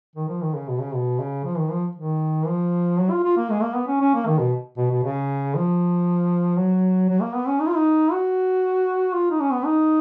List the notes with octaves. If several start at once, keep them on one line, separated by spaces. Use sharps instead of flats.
D#3
F3
D#3
C#3
B2
C#3
B2
C#3
F3
D#3
F3
D#3
F3
F#3
F4
F4
A#3
G#3
A#3
B3
C#4
C#4
A#3
D#3
B2
B2
B2
C#3
F3
F#3
F#3
A#3
B3
C#4
D#4
F4
D#4
F#4
F4
D#4
C#4
B3
D#4